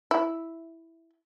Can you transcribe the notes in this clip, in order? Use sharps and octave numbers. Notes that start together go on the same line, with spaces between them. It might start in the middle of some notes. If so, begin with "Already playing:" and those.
E4